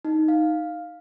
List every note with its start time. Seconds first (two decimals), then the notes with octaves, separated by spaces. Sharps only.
0.05 D#4
0.28 F5